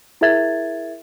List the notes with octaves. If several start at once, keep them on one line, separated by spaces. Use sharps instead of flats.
E4 G#4 A#4 E5 G#6 A6